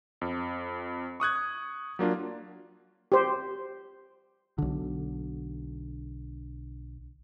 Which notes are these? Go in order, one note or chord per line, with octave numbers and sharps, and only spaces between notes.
F2
C#6 D#6 F#6 G#6
F#3 A#3 D4 F4
G4 C5
B1 D3